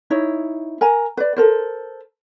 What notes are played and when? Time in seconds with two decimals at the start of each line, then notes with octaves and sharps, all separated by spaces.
0.10 D#4 E4 C#5
0.81 A#4 G#5 A#5
1.17 B4 D5
1.37 A4 A#4 C5